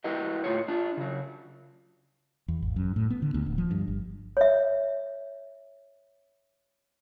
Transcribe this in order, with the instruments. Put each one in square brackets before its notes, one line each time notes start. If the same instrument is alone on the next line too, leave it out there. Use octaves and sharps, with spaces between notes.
[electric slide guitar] E4 F#4 G4 B4 D#5
A2 F4 C#5
D4 F4
C#3 F#3
[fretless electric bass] E2
G#1
F#2
A2
B3
D3
D2
D1
F3
G2
G1
[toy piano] C#5 E5